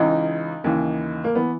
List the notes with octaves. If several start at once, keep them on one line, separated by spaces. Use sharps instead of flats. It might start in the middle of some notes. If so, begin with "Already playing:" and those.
Already playing: C#2 C#3 E3 D#4
D#2 C#3 E3
A#3
E3 B3